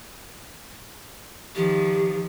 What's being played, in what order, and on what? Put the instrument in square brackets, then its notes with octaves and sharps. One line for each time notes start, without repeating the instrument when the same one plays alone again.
[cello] D#3 F3 [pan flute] G4